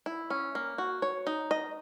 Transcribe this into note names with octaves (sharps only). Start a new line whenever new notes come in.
E4
C#4
A#3
F#4
C#5
D#4
D#5